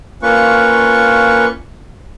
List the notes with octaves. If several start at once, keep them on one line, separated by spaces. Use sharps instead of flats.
A#3 C#4 F4 B4 C#6